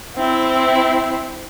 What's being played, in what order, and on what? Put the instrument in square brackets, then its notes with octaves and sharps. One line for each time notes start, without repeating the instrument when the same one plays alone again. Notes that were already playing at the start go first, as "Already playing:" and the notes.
[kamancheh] C4 E4